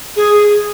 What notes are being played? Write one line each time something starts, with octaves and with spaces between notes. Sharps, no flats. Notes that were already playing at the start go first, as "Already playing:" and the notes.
G#4